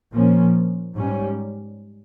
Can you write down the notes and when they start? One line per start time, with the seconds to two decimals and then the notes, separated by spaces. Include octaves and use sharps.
0.12 A#2 F3 A#3 C#4
0.94 G#2 G3 C#4